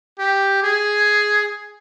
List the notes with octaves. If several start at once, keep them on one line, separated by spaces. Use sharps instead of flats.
G4
G#4